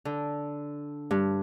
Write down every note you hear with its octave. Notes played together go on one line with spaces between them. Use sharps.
D3
G2